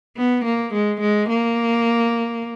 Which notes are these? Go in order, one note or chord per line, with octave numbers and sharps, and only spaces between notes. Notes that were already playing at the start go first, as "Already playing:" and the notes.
B3
A#3
G#3
G#3
A#3